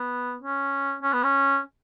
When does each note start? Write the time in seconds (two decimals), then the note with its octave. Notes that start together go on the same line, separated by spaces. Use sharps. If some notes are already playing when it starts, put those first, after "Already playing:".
Already playing: B3
0.42 C#4
1.03 C#4
1.13 B3
1.24 C#4